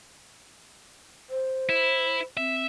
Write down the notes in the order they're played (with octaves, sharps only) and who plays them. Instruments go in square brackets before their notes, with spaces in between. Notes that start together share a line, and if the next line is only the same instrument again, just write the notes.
[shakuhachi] C5
[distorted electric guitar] E4
[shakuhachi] C4 [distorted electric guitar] E5